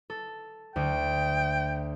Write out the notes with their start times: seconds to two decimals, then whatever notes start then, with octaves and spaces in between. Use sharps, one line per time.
0.10 A4
0.76 D2 G5